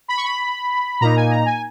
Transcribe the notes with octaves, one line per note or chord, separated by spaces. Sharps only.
B5
C#6
B5
A#2 A#3 D#4 A#5
G#5
A#5
G#5